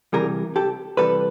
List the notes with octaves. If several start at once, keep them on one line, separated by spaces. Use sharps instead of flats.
C3 E3 G3 G#4 A#4
G4 A4
C3 E3 G3 A4 B4